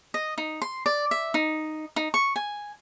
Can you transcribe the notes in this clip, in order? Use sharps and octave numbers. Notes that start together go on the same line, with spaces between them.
D#5
D#4
C6
D5
E5
D#4
D#4
C#6
G#5